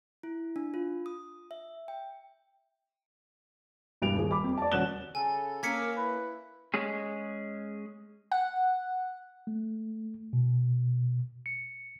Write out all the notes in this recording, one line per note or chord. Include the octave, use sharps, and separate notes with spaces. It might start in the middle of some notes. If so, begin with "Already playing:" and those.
E4
D4
F4
D#6
E5
G5
E1 G2 D7 F7
D#1 G#4
B5 D6
F2
D5 A5
D#1 C#4 F#4 F#6 E7 G7
C#3 A4 G#5
A#3 C#4 A#4 D6 E6 G#6 B6 C#7
E4 B4
G#3 C#4 G#4
F#5
A3
B2
C#7